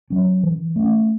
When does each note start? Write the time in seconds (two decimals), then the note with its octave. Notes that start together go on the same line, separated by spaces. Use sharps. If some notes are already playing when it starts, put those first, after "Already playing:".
0.10 F#3 C#4
0.43 E3
0.76 A3 C#4